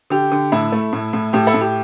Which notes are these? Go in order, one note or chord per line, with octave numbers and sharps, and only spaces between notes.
D3 G4
D3
A2 E4
A3
A2
A2
A2 G4
E4 A4
A2
G4